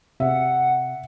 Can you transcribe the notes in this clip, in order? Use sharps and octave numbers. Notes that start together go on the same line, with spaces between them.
C3 E5 F#5